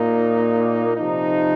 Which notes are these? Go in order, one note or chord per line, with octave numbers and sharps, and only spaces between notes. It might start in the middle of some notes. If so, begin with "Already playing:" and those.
Already playing: A#2 A#3 D#4
C3 F3 D#4